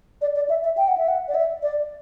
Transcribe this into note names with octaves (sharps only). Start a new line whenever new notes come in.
D5
D5
E5
E5
G5
F#5
E5
F#5
D5
E5
D5